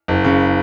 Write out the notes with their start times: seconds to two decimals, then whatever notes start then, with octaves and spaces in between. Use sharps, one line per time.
0.08 F#1
0.24 C#3